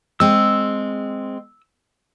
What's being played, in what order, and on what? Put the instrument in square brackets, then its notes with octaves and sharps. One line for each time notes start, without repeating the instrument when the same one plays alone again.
[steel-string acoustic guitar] G#3 C4 [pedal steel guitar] E6